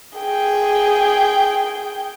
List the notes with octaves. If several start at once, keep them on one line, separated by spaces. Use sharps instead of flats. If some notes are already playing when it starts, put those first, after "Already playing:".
G#4 G5